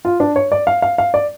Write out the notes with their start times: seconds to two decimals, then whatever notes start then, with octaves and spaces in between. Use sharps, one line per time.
0.05 F4
0.20 D4
0.36 C#5
0.52 D5
0.67 F5
0.82 F5
0.98 F5
1.14 D5